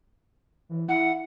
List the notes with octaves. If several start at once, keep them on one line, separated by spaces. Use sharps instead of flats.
E3
E4 F#5